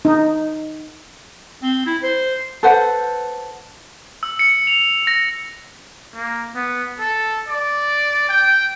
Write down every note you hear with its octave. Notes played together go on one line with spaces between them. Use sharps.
D#4
C4
E4
C5
A4 B4 C5 F#5
E6
C#7
F7
A#6
A#3
B3
A4
D5
G5